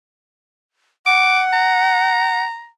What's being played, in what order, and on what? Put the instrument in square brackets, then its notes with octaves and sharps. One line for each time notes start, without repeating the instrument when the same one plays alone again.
[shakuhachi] F#5 [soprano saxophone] D6
[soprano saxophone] A#5